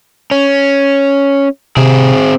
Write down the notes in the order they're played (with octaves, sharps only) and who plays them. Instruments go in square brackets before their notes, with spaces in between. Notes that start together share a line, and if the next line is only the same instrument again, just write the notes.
[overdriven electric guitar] C#4
[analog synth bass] C3 [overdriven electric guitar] C4 G#4